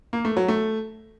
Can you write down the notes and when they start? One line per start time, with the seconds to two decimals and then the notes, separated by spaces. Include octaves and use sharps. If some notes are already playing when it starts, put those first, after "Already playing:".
0.13 A#3
0.25 A3
0.37 F#3
0.48 A3